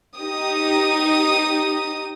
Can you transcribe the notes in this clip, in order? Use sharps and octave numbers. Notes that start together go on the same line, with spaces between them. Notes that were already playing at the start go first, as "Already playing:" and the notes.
D#4 G4 D#6